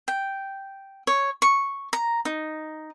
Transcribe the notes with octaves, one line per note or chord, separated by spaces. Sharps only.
G5
C#5
C#6
A#5
D#4